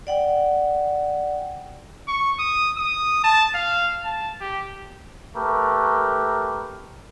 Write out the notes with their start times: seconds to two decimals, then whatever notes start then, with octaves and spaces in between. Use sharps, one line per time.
0.07 D5 F#5 G5
2.08 C#6
2.39 D#6
2.77 D#6
3.24 A5
3.55 F5
4.04 A5
4.41 G4
5.36 A3 G4 A#4 B4